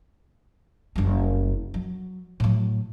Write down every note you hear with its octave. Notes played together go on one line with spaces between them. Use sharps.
F#1 G3
F#3
A2 F#3